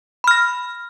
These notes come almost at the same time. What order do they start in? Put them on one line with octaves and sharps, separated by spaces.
B5 F6 A#6